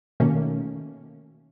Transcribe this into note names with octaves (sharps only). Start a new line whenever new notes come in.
B2 D#3 A3 A#3 C#4